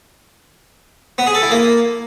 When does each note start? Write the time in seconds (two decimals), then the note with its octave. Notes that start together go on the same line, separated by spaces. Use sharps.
1.18 B3
1.26 G#4
1.35 A4
1.43 E4
1.51 A#3